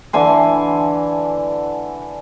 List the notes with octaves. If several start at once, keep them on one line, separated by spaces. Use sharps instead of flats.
D3 E3 G#5 C6